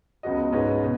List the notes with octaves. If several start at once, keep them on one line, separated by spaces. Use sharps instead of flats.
C#2 C#3 B3 F#4 D#5
G#2 G#3 C#4 B4 D#5
B2